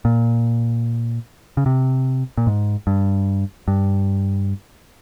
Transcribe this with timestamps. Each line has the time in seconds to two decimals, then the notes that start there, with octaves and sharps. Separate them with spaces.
0.05 A#2
1.57 C#3
1.66 C3
2.37 A#2
2.47 G#2
2.87 G2
3.68 G2